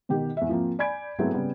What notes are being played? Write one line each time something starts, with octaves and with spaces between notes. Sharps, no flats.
B2 D#3 G4
E2 E5
F3 A#3 C4
D5 G#5 B5 G6 G#6 D7
F#3 G#3 A3 B3 C4 E4
C#3 G3 B3